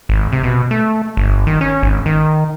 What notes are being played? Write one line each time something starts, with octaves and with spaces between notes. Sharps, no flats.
G#1
C3
B2
A3
G1
D#3
C#4
G#1
D#3